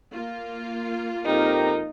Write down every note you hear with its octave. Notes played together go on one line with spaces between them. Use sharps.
A#3 F4
F2 C4 D#4 G4 A#4